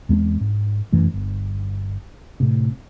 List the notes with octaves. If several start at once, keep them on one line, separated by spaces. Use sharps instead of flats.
E2 G#3 A#3 C4
G#2
F1 F#2 E3 A3
G1
A2 C3